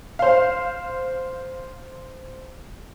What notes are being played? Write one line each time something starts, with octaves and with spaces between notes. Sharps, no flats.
C5 F5